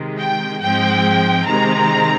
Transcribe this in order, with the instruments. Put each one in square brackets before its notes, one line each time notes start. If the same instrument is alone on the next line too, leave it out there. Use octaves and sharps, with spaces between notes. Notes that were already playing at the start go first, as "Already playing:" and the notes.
Already playing: [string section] C3 D#3 G#3
G5
G#2 F3 G#3 C4 G5
C3 D#3 G#3 C4 A#5